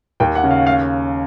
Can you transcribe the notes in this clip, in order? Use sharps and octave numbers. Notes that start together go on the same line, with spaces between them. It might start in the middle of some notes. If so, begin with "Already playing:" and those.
D#2 G5
F#5
C#3
F5
F5